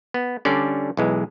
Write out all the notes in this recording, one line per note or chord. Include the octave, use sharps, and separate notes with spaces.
B3
D3 G3 C#4 D4 D5
B1 E3 G#3